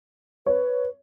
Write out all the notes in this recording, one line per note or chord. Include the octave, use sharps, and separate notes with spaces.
B4 C#5